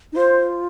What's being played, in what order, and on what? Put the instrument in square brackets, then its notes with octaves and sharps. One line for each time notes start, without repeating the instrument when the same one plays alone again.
[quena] D#4
[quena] F4 [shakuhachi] C5